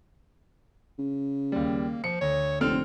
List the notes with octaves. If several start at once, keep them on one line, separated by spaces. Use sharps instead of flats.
C#3
D#2 G3 A#3
F3 C#7
D2 C#5
F1 D3 C4 A4 F6